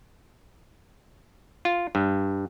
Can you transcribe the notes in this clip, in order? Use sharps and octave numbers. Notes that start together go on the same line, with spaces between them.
F4
G2